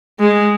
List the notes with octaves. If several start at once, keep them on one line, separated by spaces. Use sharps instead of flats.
G#3